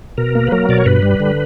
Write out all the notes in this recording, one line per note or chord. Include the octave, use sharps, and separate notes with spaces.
B2 A#4
A#3
B4
F#3 A#4
B2 D5
C#5
G2 B4
G3
D3